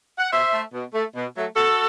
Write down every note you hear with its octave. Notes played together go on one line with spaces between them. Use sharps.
F#5
B2 C5 E5
A3
B2
A3
B2
F#3 A3
B2 F#4 A4